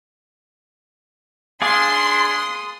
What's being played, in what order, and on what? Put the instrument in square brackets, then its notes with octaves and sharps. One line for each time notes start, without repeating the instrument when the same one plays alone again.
[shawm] D4 [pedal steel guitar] G#4 F5 D6 [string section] C6 [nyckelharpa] D#6